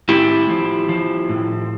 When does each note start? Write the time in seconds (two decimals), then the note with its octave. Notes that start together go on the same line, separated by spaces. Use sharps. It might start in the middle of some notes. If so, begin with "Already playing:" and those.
0.09 A2 E4 G4
0.50 F3
0.89 F3
1.29 A2